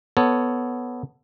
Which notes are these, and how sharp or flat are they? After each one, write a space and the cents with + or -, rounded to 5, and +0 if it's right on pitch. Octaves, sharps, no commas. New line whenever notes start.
B3 +0 A4 +0 C#5 +0